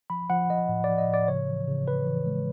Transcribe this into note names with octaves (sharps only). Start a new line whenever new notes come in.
F3 B5
F3 F#5
F3 D#5
A2
F3 D5
D#5
A2 D5
C#3 C#5
E3
C#3
C#3 B4
E3
G#3